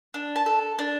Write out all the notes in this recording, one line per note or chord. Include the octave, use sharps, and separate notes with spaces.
D4
A5
A4
D4